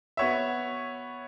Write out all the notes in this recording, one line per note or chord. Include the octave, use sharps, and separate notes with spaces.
B3 F#4 C#5 E5